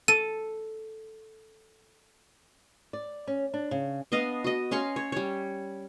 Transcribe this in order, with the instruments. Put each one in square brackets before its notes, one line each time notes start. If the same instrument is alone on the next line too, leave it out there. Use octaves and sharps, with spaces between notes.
[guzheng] A4 [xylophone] D#7
[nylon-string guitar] D5
C#4
D4
C#3
[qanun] B3 D4 D#5 F5
F#4 D#5
C#4 F5 C6 C#6
C#5
G3 C#5